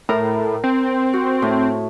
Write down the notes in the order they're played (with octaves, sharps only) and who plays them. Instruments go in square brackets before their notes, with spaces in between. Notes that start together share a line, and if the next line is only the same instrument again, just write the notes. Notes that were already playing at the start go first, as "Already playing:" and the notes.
[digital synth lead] A2 [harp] A#4
[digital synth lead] C4
[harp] F#4
A2